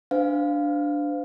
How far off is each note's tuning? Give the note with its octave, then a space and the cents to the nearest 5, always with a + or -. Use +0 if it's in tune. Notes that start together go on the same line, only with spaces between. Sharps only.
D4 +0 C5 -40 F5 +0